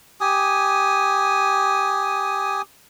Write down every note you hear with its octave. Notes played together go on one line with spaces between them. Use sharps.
G4 G#5 D#6